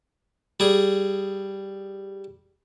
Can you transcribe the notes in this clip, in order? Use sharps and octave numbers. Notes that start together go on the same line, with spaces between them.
G3 G#4